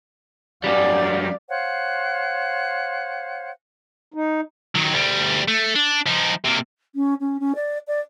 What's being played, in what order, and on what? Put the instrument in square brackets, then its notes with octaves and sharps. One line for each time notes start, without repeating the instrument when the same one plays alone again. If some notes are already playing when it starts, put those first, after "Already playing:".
[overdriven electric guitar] F#2 G3 [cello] D5 F5
[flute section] C5 C#5 F5 F#5
[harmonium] D#4
[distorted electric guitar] D#3 F#3
D2 G3
A3
D4
F3 D#4
C3 A#3
[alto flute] C#4
C#4
C#4
D5
D5